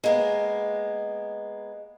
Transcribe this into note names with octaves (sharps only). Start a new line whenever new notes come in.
G#3 A#3 B3